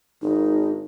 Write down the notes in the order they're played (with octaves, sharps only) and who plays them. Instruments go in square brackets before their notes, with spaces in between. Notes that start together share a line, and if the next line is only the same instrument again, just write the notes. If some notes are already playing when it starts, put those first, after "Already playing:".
[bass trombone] G#1 [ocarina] D#4